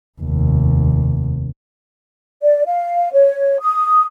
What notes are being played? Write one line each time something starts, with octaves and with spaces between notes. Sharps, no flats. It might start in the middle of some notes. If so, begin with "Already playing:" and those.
F1 D#2
D5
F5
C#5
D#6